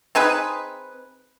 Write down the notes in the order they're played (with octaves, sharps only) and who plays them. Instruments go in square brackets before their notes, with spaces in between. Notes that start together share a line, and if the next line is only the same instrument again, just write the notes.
[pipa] C4 D#4 G#4 B4